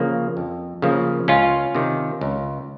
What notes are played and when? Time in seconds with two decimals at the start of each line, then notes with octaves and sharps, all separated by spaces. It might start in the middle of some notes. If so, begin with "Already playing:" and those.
Already playing: C#3 F3 A#3
0.37 F2
0.82 C#3 F3 A#3
1.28 C#2 C#4 F4
1.75 C3 D#3
2.21 C#2